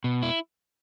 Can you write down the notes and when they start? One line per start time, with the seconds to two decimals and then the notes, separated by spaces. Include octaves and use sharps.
0.04 B2
0.23 E4